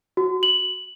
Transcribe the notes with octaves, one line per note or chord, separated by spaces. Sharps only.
F#4
F#7